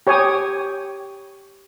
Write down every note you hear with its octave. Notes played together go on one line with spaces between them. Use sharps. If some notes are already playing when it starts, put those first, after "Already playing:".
G4 C#5 G5 G#5 D#6